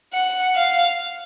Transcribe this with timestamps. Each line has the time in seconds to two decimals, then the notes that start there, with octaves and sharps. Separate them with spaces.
0.13 F#5
0.56 F5